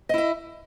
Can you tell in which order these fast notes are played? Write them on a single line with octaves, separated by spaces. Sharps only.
D#5 E4 E5